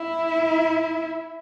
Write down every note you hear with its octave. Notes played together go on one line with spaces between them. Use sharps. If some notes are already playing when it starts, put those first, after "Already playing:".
Already playing: E4